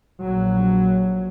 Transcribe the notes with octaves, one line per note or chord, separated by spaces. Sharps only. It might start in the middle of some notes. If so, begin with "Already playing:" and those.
A#1 F#3